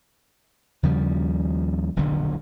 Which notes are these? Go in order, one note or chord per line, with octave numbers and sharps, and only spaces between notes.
D#2 C#3 F3 G3
D#1 B1 F2 D3